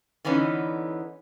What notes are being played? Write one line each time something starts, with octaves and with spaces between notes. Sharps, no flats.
D3 E3 B3 C#4 D#4